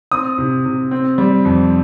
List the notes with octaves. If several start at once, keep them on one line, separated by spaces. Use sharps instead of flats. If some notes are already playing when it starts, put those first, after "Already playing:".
C4 D#6
C3
C3
C4
G3
F2